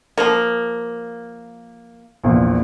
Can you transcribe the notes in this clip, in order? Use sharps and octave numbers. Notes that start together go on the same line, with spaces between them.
F3 A#3
A#1 E2 A#2